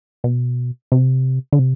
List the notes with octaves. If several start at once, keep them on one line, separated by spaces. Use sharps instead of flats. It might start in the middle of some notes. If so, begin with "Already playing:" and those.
B2
C3
D3
C3